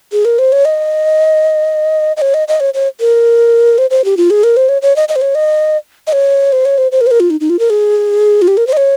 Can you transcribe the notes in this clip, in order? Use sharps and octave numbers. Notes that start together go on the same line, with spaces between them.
G#4
A#4
C5
C#5
D#5
D#5
C#5
D#5
D#5
C#5
C#5
A#4
C5
C5
G4
F4
G#4
A#4
C5
C#5
C#5
D#5
D#5
C5
C#5
D#5
D#5
C#5
C5
C#5
C5
C5
A#4
C5
A#4
F4
D#4
D#4
F4
A#4
G#4
F4
G4
A#4
C5
D#5
C#5